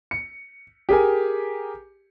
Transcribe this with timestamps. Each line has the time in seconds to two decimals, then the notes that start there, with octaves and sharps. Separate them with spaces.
0.11 C#7
0.89 G4 G#4 A#4 G#5